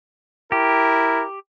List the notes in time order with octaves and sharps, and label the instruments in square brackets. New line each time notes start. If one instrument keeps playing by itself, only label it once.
[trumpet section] E4 A#4 [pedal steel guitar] G4